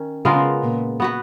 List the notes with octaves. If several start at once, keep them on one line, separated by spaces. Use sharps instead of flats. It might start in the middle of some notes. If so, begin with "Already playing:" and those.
Already playing: D#3 C#4
C#3 G#3 B3 F4 A#4
A#2
B3 F#4 B4